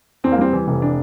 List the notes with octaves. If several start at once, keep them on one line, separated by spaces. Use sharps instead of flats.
E2 C4
A#3
G3 C4
E3
F1
D4